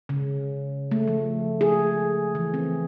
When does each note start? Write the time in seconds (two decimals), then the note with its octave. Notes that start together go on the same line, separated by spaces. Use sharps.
0.09 C#3
0.91 A3
1.08 F3
1.61 G#4
2.35 E3
2.54 C4